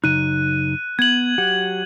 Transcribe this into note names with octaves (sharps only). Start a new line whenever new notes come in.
F#2 C#3 D#4 F#6 D#7
B3 G#6 F#7
F#3 G4 F#5